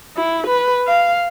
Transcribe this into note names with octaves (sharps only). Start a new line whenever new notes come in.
E4
B4
F5